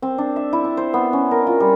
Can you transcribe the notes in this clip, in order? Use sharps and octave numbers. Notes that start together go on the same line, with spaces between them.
C4
D4
E5
E4
D4
C5
B3
C#4
A#4
F4
G3